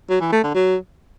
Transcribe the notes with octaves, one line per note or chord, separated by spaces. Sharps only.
F#3
E3
A3
D3
F#3